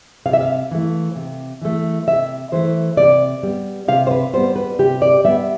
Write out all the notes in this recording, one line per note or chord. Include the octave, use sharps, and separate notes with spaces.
C3 F5
E5
F5
E3 A3
C3
E3 A3
C3 E5
E3 A3 C5
C3 D5
G3 B3
C3 F5
C5
B4
G3 B3 C5
B4
C3 G4
D5
G3 B3 E5